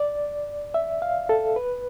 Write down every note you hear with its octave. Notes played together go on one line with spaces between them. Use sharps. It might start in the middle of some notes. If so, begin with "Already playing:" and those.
Already playing: D5
E5
F5
A4
B4